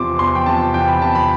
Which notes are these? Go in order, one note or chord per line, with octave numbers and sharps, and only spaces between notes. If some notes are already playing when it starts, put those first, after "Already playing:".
Already playing: E2 C3 F3 C6 D6
E2 C6
G5
C3 F3 A5
E2 G5
B5
C3 F3 A5
B5